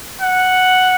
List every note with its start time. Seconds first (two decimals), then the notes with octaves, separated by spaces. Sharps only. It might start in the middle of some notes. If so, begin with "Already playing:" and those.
0.22 F#5